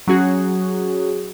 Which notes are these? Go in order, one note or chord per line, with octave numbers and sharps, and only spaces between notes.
F#3 C#4 F#4 G#4